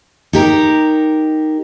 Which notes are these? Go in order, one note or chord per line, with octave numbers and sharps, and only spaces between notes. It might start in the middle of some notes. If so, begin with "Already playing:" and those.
D#4 G4 A#4